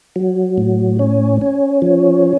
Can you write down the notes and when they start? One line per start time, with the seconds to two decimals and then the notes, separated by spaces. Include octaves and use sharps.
0.16 F#3
0.58 A2
0.99 C#4
1.41 C#4
1.82 F3